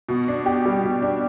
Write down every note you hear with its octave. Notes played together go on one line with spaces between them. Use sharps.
B2
D4
G4
G3
B2
D4